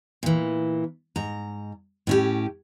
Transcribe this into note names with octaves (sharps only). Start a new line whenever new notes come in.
A#2 E3
G#2 A#5
A2 C#4 G4